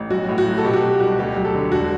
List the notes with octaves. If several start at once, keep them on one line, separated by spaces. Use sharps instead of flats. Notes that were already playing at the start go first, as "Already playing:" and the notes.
Already playing: A1
B1 F#4
A2
F#4
F#3
A4
B2 G4
F#4
B2 G4
C2 F#4
D2 G4
F#3
A4
D3
E1 F#4